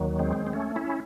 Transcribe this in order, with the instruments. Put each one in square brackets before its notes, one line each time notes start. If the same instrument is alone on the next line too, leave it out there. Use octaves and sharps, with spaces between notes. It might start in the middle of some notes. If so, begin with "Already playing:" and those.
Already playing: [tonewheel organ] D#2 D#3 F#3
G#3 C4
C4
A3 C#4
C#4 E4